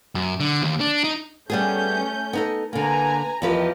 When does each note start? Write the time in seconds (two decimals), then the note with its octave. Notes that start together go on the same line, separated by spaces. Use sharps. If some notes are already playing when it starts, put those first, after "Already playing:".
0.15 F#2
0.40 D3
0.62 D#2
0.80 D4
1.04 D#4
1.50 G3 A3 B3 C#4 G#4 G6
2.33 B3 D#4 A4
2.73 D3 A#3 B4 G#5 A#5
3.42 E2 F3 G4 A#4 B4 D#5